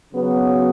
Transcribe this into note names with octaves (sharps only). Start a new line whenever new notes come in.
C#3 F#3 B3